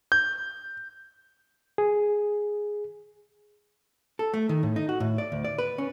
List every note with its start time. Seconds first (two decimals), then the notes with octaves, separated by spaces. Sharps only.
0.12 G6
1.78 G#4
4.19 A4
4.34 A3
4.49 D#3
4.63 A2
4.76 D#4
4.89 F#4
5.00 A2
5.18 D5
5.32 D2
5.45 D5
5.58 B4
5.78 C#4